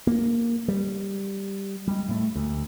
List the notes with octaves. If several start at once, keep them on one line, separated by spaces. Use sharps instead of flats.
A#3
G3
G3 G#3
A2 A3
D2